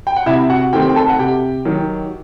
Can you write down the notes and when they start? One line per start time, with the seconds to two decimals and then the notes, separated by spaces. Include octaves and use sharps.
0.07 G5
0.16 F#5
0.26 C3 E4 E5
0.50 F#4 F#5
0.73 D#3 A3 C4 G4 G5
0.89 G5
0.96 A4 A5
1.09 F#5
1.19 C3 G4 G5
1.65 D#3 F#3